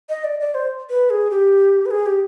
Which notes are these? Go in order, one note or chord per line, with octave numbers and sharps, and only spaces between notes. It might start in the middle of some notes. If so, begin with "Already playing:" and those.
D#5
D5
D5
C5
B4
G#4
G4
B4
G#4
G4